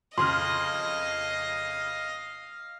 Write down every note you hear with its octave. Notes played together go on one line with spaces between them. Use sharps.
F2 C#3 D#5 F5 C6 F6